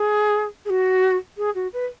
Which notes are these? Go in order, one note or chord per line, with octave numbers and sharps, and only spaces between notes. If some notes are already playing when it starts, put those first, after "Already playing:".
Already playing: G#4
G#4
F#4
G#4
F#4
B4